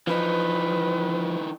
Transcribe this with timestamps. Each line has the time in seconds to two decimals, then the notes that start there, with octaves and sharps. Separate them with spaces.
0.07 E3 F3 D#4 B4